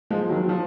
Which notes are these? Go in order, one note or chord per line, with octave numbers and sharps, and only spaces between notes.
F3 G#3
F3
D#3 F#3
F#3
F3